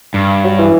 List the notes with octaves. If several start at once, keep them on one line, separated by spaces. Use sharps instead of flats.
G2
F#3
E3